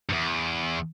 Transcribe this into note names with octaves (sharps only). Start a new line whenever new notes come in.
E2 G2